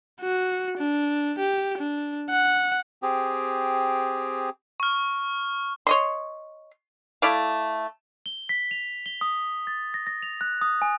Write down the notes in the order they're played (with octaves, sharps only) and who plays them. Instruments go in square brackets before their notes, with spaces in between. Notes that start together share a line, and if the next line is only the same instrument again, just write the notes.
[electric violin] F#4
D4
G4
D4
F#5
[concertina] C4 G4 G#4
[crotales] C#6 F6
[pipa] C#5 D#5 C6
A3 E4 D5 F5
[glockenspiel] G7
B6
F7
G7
D#6
A6
A#6
A#6
F7
F#6
D#6
G#5